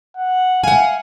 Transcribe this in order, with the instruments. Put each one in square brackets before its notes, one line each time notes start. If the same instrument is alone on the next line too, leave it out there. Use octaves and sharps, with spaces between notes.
[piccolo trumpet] F#5
[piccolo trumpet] F5 [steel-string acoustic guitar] F#5 G#5